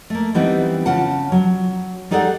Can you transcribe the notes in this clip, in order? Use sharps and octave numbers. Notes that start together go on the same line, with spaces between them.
A3 A#3
E3 G3 B3 C4 D#4 E4
C#3 F4 F#5 A5
F#3
G3 D#4 G#4 A4 D5 F#5